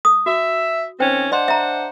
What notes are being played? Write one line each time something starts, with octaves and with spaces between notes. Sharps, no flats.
D#6
F#4 E5
D#3 C4 C#4 C5 G5
D4 C5 D5 D#5 F#5 C6
E5 A#5